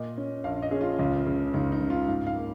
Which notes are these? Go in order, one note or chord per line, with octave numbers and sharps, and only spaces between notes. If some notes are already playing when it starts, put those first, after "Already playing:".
Already playing: A#2 D#5
C#4
A#1 F5
D#5
C#4 G#4
F4
C#2
C#3
C#2 D#4
D#4
C#3
F4
G#2 F5
F5
A#3